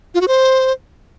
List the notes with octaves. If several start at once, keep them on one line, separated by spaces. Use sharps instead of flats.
F4
F#4
C5